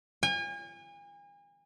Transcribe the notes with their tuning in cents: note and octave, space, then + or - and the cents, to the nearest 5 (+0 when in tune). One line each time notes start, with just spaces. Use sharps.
G#5 -40